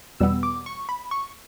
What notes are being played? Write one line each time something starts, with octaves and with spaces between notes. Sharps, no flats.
E2 B2 G3 B3 E6
D6
C#6
B5
C#6